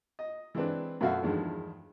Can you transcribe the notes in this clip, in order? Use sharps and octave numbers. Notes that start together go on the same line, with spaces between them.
D#5
E3 G#3 C4 D4 B4
F#2 B2 A3 F#4 E5 F5
E2 G2 D#3 F3 G#3